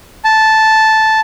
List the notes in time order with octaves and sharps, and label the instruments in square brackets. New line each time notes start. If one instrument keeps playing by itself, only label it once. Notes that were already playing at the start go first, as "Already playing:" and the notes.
[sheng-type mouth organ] A5